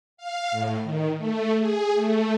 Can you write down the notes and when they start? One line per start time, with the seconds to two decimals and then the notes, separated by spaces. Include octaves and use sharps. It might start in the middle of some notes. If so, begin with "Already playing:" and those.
0.17 F5
0.51 A2
0.83 D#3
1.17 A3
1.59 G#4
1.95 A3